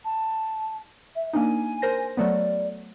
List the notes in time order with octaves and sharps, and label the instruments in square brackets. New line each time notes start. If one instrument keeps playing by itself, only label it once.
[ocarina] A5
E5
[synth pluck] A#3 D4 D#4 [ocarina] G#5
[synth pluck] A#4 C5 A#6
[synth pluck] F#3 A3 B3 [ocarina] D5